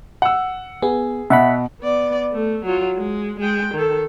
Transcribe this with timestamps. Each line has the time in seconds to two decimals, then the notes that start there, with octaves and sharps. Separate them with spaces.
0.22 F#5 E6
0.82 B3 G#4
1.30 B2 E5 F#5 B5
1.82 B3 D5
2.33 A3
2.65 F#3 F4
2.97 G#3
3.40 G#3 G5
3.74 D#3 A4